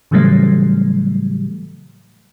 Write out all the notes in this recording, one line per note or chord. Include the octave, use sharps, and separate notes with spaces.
A2 C#3 E3 F#3 G3 A3